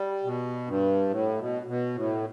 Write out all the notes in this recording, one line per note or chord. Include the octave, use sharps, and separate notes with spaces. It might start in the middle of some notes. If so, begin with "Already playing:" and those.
Already playing: G3
B2
G2
A2
B2
B2
A2